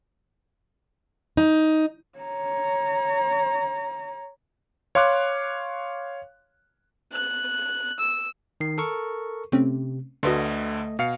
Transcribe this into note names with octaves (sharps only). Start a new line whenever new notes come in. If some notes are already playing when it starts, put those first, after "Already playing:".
D#4
C#5 A#5
C#5 F5 C6 D6 F#6
F#6
E6
D#3 C7
A4 A#4 C#6
C3 A3 C4 C#4
D2 D3 A3 F#4 B4 D#5 C6
B2 F5 C#7